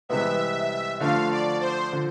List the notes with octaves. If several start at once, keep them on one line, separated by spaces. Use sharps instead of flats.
C2 C3 E3 G#3 B3 E5
D3 F3 A3 D4 F4 F5
D5
C5
D3 F3